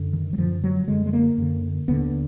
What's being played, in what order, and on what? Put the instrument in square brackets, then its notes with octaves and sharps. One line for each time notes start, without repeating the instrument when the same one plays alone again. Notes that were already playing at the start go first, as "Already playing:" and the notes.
Already playing: [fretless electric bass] F#2 D3
D#3
F#3
F#2 D3 F3
F#3
F#2 D3 G#3
G#3
A#3
F#2 D3
D#2 D3 B3